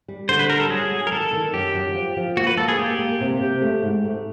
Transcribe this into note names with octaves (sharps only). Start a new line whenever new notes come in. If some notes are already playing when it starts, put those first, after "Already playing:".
G3
D3 C5
B4
G3 A#4
A4
F#3 G#4
B3
A#4
D#3 A4
D#3
F#2 G4
F#3
F3
F3
A#3 F#4
B4
A#3 A4
G#4
A#3 G4
A#3
C3
C3
A3
G#2
A3